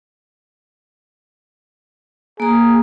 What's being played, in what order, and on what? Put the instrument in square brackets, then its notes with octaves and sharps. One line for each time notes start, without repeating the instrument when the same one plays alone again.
[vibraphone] A#3 A#5 [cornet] G#4